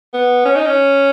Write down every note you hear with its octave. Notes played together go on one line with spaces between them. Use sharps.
B3
C#4
D#4
C#4